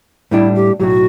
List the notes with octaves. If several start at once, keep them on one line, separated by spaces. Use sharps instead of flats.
A2 G3 D4 E4
G4
B1 A2 F#3 F#4 G4